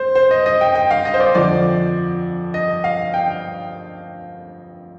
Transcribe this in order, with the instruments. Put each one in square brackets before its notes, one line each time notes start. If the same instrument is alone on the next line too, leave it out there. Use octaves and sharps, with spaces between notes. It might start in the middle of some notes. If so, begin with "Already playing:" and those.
Already playing: [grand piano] C5
C5
D#5
D#5
G5
G5
F5
D#5
C5
D5
F2 D3 F3 D5
D#5
F5
G5